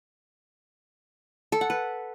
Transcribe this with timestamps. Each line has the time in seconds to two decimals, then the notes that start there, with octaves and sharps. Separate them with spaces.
1.52 A4
1.61 F#5
1.70 B4